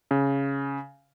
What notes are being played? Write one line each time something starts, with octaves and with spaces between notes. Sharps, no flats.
C#3